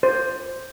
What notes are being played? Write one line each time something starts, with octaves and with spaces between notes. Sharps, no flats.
C5